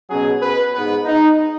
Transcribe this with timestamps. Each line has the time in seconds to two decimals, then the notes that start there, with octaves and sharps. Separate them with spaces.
0.10 B2 F#3 C#4 G#4
0.42 B4
0.73 G#2 G#3 B3 B4
1.05 D#4